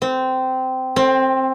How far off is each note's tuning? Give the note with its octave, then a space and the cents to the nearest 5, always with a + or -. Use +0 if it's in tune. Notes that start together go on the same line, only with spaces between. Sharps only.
C4 -15
C4 +15